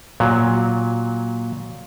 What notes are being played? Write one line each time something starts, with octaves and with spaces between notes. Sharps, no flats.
A#2 F#3